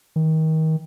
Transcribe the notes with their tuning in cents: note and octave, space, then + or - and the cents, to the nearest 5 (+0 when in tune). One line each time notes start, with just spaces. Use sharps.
D#3 +30